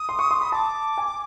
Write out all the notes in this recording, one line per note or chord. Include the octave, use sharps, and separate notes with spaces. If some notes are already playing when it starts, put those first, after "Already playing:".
Already playing: D#6
C6
C#6
C6
B5
A5 D6
G#5